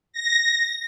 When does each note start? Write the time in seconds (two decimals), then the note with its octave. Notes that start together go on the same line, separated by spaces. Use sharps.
0.13 A#6